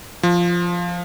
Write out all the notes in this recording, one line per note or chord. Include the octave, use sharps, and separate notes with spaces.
F3